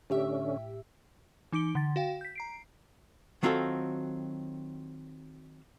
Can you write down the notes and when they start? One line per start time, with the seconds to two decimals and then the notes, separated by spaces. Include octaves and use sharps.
0.10 A2 D3 C#4 G4 E5
1.53 E3 D#4 D6 D7 G7
1.75 D3 A6
1.96 F#4 F5 G5
2.21 G6 B6
2.35 A#5 C7 D7
3.43 D#3 F#3 C4 F4 F#4 A4